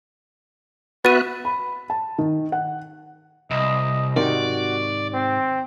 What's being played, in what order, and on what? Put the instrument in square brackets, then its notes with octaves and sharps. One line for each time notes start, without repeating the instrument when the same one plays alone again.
[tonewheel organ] B3 E5 F#6 [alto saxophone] F#4 [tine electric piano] B4 [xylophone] A6 D#7
[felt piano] B5
A5
D#3
F#5
[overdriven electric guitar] C2 [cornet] D#5
[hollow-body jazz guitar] G#2 C3 D#3 [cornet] F#4 [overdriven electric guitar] D5
[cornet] C4